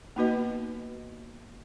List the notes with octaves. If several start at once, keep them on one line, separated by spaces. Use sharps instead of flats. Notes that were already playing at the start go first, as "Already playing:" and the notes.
A#3 B3 D#4 F#4 B4 D#5